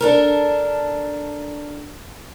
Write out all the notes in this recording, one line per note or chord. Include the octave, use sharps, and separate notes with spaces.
D4 A4 A#4